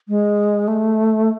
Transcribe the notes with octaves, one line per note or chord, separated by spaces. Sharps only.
G#3
A3